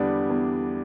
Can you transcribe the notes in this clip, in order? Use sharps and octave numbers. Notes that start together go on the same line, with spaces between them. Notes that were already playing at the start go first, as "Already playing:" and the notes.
Already playing: E2 D3 G3 B3 D4
E2